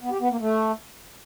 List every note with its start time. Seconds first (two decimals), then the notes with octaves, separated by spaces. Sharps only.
0.01 B3
0.11 G4
0.21 B3
0.31 A#3
0.40 A3